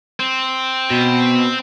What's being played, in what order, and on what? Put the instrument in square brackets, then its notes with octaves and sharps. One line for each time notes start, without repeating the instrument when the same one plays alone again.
[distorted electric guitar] C4
[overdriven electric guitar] B2